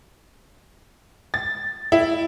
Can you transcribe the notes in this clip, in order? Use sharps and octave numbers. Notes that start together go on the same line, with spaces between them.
A6
E4